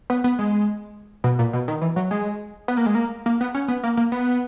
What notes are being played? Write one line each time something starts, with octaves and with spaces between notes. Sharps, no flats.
B3
B3
G#3
B2
A#2
B2
D#3
E3
F#3
G#3
B3
A#3
G#3
A#3
A#3
B3
C#4
B3
A#3
A#3
B3